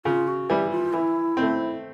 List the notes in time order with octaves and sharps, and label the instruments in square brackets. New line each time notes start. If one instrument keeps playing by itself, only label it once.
[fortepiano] C#3 [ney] F4
[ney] F#4
[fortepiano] E3 G3 [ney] G4
[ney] F4
[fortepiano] E3 [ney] E4
[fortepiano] A3 C4